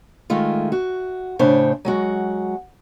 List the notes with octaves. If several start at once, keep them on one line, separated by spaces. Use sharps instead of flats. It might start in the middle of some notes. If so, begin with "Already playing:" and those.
D#3 G#3 A3 F4
F#4
A2 C#3 D4 C5 C#5
F#3 G#3 F#4